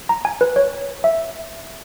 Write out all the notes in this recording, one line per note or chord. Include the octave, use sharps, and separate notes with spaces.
A#5
G#5
B4
C#5
E5